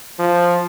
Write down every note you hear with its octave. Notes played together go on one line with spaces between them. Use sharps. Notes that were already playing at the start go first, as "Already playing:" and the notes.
F3